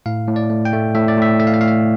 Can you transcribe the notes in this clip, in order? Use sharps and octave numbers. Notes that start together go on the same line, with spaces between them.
A2 F5
A2
D5
A3
G5
A3
A2 E5
D5
A2 E5
A3 E5
F5
E5
A2 F5
E5